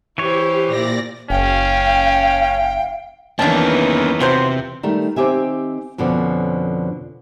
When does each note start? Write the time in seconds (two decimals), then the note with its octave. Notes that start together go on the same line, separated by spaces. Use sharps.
0.18 E3 E4 G4 C5 C#5
0.67 A#2 D5 A#6
1.30 F#1 C#4 F5 G5
3.39 E2 D#3 E3 A#3 C#4 D4 A5
4.20 C3 F3 F#3 C5
4.83 D#3 G3 A3
5.16 D#3 C4 G4 E5 G#5
5.98 F2 B2 D3 F3 C#4